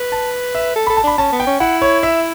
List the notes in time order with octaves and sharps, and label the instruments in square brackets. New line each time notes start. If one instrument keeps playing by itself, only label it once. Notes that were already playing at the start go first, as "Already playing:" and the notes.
Already playing: [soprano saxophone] B4
[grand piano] A5
E5
[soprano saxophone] A4
[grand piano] B5
[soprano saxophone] A4
[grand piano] A5
[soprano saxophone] D4 [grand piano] B5
[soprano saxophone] C#4 [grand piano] A5
[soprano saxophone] B3
[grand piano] G5
[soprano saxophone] C#4
[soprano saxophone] E4 [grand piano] F#5
[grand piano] C#5
E5